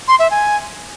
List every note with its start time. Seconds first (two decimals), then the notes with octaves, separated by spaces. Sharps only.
0.08 C6
0.19 E5
0.31 G#5